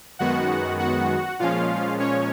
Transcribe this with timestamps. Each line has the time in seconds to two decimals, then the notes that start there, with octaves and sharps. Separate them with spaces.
0.19 F#2 D#3 G#3 B3 F#4 F#5
0.79 F#4 F#5
1.39 A#2 F3 G#3 C#4 F4 F5
2.00 C#4 C#5